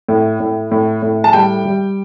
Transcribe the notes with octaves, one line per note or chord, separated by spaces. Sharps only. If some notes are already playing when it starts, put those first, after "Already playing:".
A2
A2
A2
A2
A5
G3 G5
G3